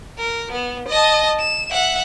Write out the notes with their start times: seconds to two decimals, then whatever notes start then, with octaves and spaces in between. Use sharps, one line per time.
0.18 A#4
0.52 B3
0.88 D#5 A5
1.39 E7
1.71 E5 F#5